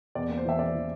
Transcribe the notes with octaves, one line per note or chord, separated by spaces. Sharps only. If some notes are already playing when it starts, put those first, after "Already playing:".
E2 D5
A#3
C5
E3 E5
A#3 D5
E3